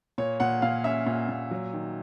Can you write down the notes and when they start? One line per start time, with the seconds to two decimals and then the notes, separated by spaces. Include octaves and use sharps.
0.18 A#2 C#5
0.40 A#2 F#5
0.62 A#2 F5
0.84 C#4 E5
1.06 A#2
1.29 A#2
1.51 F#3
1.73 D#3